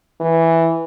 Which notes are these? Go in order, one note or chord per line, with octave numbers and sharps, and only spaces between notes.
E3